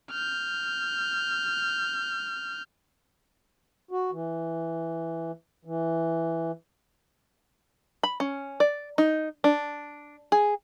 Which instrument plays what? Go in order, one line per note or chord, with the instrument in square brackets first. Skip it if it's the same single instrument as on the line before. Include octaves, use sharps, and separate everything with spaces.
[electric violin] F6 G6
[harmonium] F#4
E3
E3
[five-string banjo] B5
C#4
D5
D#4
D4
G#4